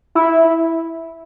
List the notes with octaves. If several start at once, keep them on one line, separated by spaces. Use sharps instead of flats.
E4